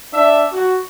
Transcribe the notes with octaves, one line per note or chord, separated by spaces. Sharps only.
D4 E5
F#4